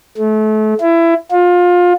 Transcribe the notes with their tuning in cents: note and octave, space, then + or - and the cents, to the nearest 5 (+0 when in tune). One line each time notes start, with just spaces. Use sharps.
A3 -30
E4 +20
F4 +25